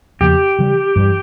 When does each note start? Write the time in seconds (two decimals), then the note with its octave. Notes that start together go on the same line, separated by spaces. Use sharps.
0.20 E2 C#3 F3 A#3 G4
0.59 C#3 E3 G3
0.96 G2 E3 G3